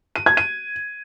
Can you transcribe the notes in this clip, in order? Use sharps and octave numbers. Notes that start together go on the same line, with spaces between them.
D#7
G#6
D#7